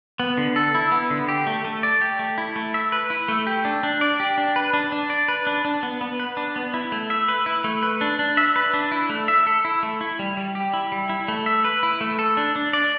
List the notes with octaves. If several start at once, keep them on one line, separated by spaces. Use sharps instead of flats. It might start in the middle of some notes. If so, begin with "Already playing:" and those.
B3
D3
A4
E4
B3
D3
G4
A3
A3
D5
G4
A3
E4
A3
E5
B4
E4
A3
G4
D4
D4
D5
G4
D4
B4
D4
D4
D5
B4
D4
D4
B3
B3
B4
D4
B3
E4
A3
E5
B4
E4
A3
B4
D4
D4
E5
B4
D4
E4
A3
E5
A4
E4
A3
E4
G3
G3
G4
E4
G3
E4
A3
E5
B4
E4
A3
A4
D4
D4
D5